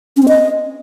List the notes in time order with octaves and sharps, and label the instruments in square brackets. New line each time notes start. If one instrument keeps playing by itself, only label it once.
[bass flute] C#4
C4
D#5